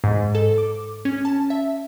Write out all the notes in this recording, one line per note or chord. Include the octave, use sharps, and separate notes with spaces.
G#2
A4
D6
C#4
A5
E5